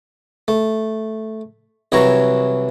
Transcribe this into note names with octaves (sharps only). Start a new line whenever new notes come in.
A3
C2 E3 F#3 E4 C#5 A#5